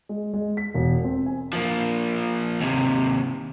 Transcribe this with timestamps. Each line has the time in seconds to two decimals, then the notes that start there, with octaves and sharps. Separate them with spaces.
0.09 G#3
0.34 G#3
0.57 B6
0.74 E1
1.04 C4
1.26 G#5
1.53 F3 A#3
2.60 D#2 C3